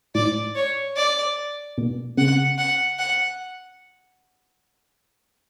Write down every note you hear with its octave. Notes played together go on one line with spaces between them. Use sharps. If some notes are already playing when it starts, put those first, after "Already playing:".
A2 D5
C#5
D5
B2
C#3 F#5
F#5
F#5